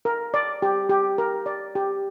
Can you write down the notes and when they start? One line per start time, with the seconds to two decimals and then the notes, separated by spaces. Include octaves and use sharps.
0.05 A#4
0.34 D5
0.62 G4
0.89 G4
1.18 A#4
1.46 D5
1.75 G4